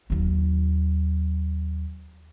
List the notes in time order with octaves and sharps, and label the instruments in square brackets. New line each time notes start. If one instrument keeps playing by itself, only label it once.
[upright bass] D#2 F#3